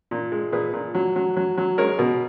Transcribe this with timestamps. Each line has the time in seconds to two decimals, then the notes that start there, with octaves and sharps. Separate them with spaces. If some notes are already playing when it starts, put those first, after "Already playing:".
0.11 A#2
0.32 G#3
0.52 A#2 G#4 B4
0.73 A#2
0.95 F#3
1.16 F#3
1.37 F#3
1.58 F#3
1.78 G#3 A#4 C#5
1.99 B2